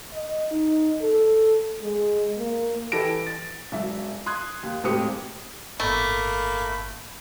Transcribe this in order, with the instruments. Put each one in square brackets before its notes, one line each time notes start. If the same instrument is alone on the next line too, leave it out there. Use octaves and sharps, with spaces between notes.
[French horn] D#5
D#4
A4
G#3
A#3
[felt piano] E3 E4 G4 A4 A#6 D7
A6
E1 F#3 E5
C6 D#6 F#6 G#6
D#2
E1 A2 C4 G4 D#6 C#7
[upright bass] G1 A2 [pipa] A3 [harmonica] A#3 B5